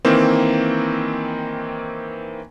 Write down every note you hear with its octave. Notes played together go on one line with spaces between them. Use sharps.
D#3 E3 A#3 C4